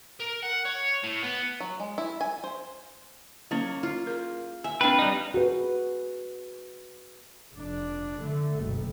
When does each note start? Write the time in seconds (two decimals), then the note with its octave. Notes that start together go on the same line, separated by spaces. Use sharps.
0.20 A#4
0.43 F#5
0.65 C#5
1.03 A2
1.22 B3
1.60 F#3
1.80 G#3
1.98 E4
2.21 G#5
2.44 C5
3.51 F#3 A#3 C#4 C#5
3.83 F4
4.07 G#4 A#4
4.64 E5 G#5
4.81 C4 D4 B4 F5 G5 A5
4.99 G3 D#4
5.34 F#4 G#4 B4
7.55 F1 D4
8.22 D3 A3
8.59 F#1 B1